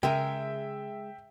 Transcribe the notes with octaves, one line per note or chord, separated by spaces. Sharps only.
C#3 G#3 G#4 A#4 E5 G5